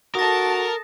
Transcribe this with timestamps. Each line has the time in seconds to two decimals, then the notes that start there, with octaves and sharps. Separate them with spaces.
0.15 F#4 A4 A#4 A5 D#6 A#6